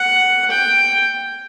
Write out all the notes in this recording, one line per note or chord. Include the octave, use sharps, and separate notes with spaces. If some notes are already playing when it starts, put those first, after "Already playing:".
Already playing: F#5
G5